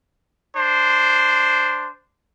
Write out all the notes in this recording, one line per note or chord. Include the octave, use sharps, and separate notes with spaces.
D4 C5